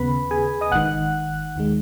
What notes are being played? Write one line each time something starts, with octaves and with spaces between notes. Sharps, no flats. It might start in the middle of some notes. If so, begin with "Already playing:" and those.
Already playing: D#2 C#3 B3 B4 B5
G#4 G#5
D#5 D#6
G#1 G#2 D#3 F#5 F#6
D#2 D#3 G#3